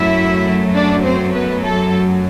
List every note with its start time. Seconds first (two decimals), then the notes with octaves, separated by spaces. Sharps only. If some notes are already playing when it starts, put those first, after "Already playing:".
Already playing: F#2 F#3 A3 E4 E5
0.74 D4 D5
1.04 C4 C5
1.33 B3 B4
1.63 A3 A4